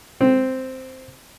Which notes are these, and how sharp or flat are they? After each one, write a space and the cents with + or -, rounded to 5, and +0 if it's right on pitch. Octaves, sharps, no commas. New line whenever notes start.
C4 -5